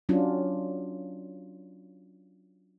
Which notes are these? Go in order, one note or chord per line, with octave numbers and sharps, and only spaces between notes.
F#3 C#4 D4 F4